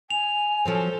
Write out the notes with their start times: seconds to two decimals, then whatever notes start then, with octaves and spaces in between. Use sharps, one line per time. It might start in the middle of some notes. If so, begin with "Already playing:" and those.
0.10 G#5 F7
0.65 F3 F#3 C4 A4 C5